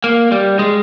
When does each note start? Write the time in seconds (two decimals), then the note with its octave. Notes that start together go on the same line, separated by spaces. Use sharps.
0.04 A#3
0.32 G3
0.59 G#3